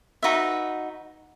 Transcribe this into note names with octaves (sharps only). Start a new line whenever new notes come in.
D#4 F#4 B4 E5